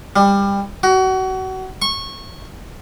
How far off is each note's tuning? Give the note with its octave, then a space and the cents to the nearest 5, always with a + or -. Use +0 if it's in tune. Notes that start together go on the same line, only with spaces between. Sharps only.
G3 +25
F#4 +30
C#6 -20